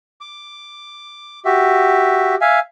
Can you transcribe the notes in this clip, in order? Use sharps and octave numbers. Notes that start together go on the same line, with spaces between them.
D6
F#4 G4 E5
E5 F5 G#5